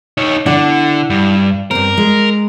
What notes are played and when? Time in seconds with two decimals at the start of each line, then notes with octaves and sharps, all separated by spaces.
0.18 D#4 C#5
0.46 D3 D4 E4 F#5
1.10 G2
1.71 G2 C4 A#4
1.98 G#3